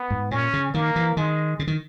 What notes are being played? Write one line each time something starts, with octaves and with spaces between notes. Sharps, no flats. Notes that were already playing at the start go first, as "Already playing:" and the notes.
Already playing: B3
G#2
A#2 C#4
C#3
D#3 A#3
E3
D#3 G#3
C#3
D#3